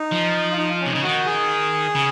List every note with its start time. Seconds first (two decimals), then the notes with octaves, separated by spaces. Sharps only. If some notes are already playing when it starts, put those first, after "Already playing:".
Already playing: D#4
0.12 F3
0.51 F4
0.57 D#4
0.68 F4
0.80 C#4
0.86 C3
0.92 C#3 D#4
1.03 D#3 F#4
1.26 G#4
1.95 C#3